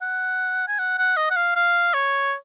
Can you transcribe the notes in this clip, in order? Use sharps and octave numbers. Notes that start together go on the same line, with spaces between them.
F#5
G#5
F#5
F#5
D#5
F#5
F5
F5
C#5